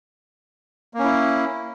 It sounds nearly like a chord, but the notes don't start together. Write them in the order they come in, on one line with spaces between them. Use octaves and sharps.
A#3 C#4 E4